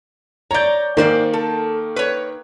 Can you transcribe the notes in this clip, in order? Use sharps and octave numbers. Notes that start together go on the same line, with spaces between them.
C#5 D5 A#5 G6
G#2 D#3 A#3 C5 D5
A4
B4 C#5